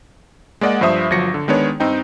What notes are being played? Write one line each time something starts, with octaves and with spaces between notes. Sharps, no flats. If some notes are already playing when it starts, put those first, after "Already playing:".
G#3 A#3 D5 D#5 F#5
G2 F3 C5 E5 D#6
G1 F3 F#3 A#6 C#7
D3
D#3 G#3 B3 D4 C#5
G2 C4 D#4 G5